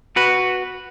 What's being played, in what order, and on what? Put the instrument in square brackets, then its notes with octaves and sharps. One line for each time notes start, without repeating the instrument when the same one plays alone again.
[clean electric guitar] F#4 B4